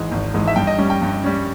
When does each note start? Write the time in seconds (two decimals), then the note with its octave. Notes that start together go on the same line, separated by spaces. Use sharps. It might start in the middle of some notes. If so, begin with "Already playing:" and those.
Already playing: G#1 G#2 E3 G#3
0.12 G#1
0.34 G#2 E3 G#3
0.47 E5
0.56 G2 G5
0.67 D#5
0.78 G3 C#4
0.90 G5
1.01 G2
1.24 G3 C#4